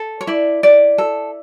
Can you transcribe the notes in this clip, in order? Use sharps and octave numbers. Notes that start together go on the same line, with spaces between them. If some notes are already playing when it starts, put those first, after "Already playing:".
Already playing: A4
C#5
E4 D5
E4 D5
A4